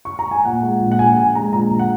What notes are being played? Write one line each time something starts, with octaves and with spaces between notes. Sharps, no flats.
C#6
A#5
G#5
A#2 F#5
G#3
A#1
F#5
A#1 G#5
A#2 G#5
G#3 A#5
A#1 A#5
A#1
F#5